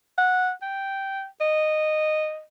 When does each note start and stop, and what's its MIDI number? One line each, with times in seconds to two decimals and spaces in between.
0.18 0.51 78
0.62 1.25 79
1.41 2.42 75